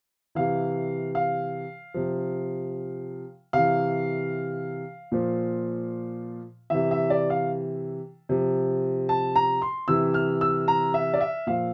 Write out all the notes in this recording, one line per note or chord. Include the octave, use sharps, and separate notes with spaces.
C3 E3 F5
F5
C3 F3
C3 E3 F5
A#2 F3
C3 E3 E5
E5
D5
F5
C3 F3
A5
A#5
C6
C3 E3 E6
F6
E6
A#5
E5
D5
E5
A#2 F3 F5